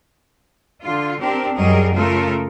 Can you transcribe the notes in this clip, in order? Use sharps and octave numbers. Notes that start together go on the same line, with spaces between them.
D3 F4
C4 D4 G4 A#4
F#2 F#3 G3 G#4 A#4 D#5
C#3 A3 F4 A4 A#4